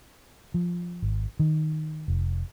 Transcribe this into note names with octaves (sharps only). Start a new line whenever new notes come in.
F3
G#1
D#3
F1